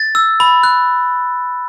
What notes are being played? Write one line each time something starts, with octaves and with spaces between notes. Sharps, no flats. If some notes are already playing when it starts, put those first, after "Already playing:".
Already playing: A6
E6
B5
F#6